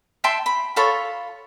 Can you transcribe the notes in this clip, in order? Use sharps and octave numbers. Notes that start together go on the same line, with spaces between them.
E5 G5 A5 C6
B5
F4 A4 C#5 B5